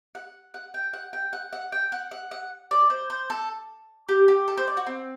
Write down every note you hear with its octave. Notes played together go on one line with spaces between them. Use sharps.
F#5
F#5
G5
F#5
G5
F#5
F#5
G5
F#5
F#5
F#5
D5
C5
C5
A4
G4
G4
A4
C5
D5
F#4
C4